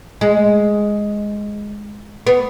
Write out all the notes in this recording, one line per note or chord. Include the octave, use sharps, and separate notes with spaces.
G#3
B3